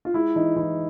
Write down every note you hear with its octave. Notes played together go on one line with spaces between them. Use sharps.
F4
G#3 E4
E3 D#4
E3 E4